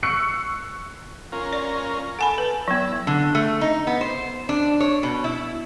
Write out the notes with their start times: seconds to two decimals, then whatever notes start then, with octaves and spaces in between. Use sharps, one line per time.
0.03 C#6 E6 F#6 C7 C#7
1.32 C#4 F4 A#4
1.53 D5
2.19 A4 F#5 G#5 B5
2.38 B4
2.68 F#3 B3 E4
3.07 D3
3.35 A3
3.61 D#4
3.87 B3
4.01 C5
4.49 D4
4.80 C#5
5.03 B2
5.24 E4